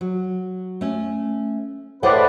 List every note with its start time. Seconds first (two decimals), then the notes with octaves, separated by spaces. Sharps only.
0.01 F#3
0.81 A3 C#4
2.03 A2 G#4 B4 C5 D5 F#5